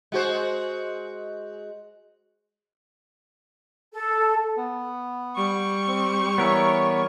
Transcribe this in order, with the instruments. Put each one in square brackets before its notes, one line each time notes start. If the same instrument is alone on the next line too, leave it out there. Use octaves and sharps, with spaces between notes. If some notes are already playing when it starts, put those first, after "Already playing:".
[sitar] G#3 F#4 C5
[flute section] A4
[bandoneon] B3
[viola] G3 C#6
[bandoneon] C4
[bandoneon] E3 [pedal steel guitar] B3 A#4 E5 [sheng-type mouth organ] C#5